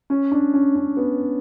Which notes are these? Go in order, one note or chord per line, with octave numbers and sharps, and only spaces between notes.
C#4
D4
C#4
C#4
B3